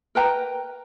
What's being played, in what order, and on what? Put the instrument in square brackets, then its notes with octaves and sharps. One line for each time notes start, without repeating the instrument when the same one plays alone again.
[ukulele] A#4 B4 G5 A#5